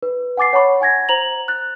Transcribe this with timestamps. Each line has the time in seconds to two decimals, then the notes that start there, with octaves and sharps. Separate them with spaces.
0.03 B4
0.37 F#5 G#5 D6 A6 C7
0.53 C#5 F#5 A5 B5 C#6
0.80 F#5 G#5 G#6 A#6
1.09 C5 A#5 F7 F#7
1.48 F#6 A6